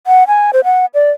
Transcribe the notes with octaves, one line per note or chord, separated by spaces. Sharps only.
F#5
G#5
C5
F#5
D5